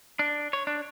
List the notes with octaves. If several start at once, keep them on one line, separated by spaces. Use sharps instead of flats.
D4
C#5
D4